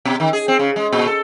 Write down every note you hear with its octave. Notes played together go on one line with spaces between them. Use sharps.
B2
D#3
G#4
C4
C#3
G#3
A#2
A4